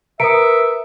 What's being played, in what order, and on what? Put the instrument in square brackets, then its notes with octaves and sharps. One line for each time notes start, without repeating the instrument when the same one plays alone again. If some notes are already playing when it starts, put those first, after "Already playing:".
[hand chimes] A#4 B4 D#6 [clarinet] E5 [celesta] A#5 C#7 D7